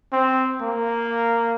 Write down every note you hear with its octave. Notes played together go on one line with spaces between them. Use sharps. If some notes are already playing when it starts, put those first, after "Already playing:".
C4
A#3